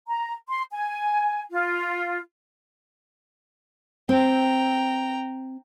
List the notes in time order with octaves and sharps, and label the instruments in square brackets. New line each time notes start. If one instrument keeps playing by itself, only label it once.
[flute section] A#5
C6
G#5
F4
[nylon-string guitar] C4 [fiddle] G5 A#5